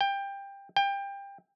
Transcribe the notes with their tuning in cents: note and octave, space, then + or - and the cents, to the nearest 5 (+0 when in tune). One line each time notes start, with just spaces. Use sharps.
G5 +20
G5 +25